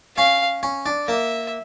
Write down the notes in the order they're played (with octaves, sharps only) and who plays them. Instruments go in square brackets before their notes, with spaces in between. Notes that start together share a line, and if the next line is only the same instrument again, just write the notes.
[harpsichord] C#4 [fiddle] F5
[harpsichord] C#4
D4
[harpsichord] A#3 [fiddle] E5